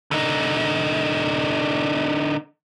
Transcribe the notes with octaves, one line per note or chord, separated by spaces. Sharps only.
D3 D#4